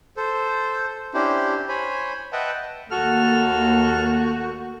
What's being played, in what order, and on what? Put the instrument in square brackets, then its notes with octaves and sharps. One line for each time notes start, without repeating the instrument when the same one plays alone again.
[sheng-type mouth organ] A4 C5
C#4 D4 E4 G4 C5
C5 C#5 G#5 B5
B4 D#5 E5 F#5 G5 A5
[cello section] D#2 [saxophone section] A3 F#4 [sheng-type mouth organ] A4 F6